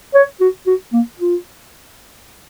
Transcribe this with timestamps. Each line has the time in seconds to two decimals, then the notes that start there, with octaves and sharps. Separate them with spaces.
0.14 C#5
0.40 F#4
0.66 F#4
0.93 A#3
1.19 F4